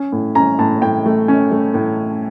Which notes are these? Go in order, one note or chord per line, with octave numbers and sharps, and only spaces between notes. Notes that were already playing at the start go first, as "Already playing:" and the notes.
Already playing: C#4
A2
C#4 A#5
A2 A5
A2 G5
A3
C#4
A3
A2